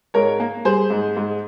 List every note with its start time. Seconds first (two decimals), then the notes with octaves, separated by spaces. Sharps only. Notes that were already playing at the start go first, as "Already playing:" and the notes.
0.14 G#2 A#4 C#5
0.40 A#3
0.65 G3 G#4 C5
0.90 G#2
1.17 G#2